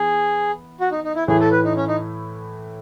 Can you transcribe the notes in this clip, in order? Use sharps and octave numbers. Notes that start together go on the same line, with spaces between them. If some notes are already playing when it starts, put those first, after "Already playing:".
Already playing: E3 B3 G#4
F#4
D#4
D#4
E4
A2 E3 A3 E4 G#4
A4
B4
D#4
C#4
D#4